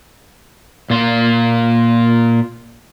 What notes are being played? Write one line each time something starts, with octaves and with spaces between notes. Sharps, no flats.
A#2 F4